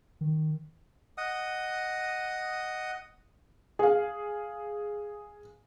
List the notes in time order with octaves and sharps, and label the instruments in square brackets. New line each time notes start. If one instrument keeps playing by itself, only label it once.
[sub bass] D#3
[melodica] D#5 F#5 D#6
[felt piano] G#4 F5